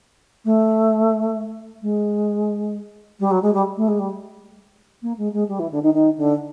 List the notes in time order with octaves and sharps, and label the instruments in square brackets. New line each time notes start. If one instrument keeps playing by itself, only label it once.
[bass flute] A3
G#3
G3
F#3
G#3
G3
A3
G#3
G3
A#3
G#3
G#3
G3
E3
D3
D#3
D#3
D3